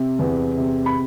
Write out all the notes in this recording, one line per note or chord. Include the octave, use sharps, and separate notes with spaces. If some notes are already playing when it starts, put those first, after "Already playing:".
Already playing: C3
E2
C3
B5